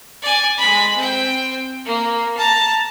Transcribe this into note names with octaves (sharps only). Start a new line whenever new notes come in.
D5 G#5
G#3 B5
C4 G5
A#3
A5 A#5